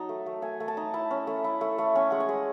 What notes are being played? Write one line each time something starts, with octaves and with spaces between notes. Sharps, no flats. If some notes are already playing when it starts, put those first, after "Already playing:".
Already playing: F#3 D#4 A5
A3
A3
A3 G#5
A3
A5
D#4
E4 A5
C#4
A3
E4
A3
A3
C#4 G#5
G#3 F#5
G#5
G#3